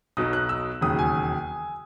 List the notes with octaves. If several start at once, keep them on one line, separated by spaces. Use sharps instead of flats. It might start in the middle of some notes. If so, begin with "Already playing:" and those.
B1 B2 F#3 D#6
F#6
E6
E1 D#2 C#3 F#3 D#6
G#5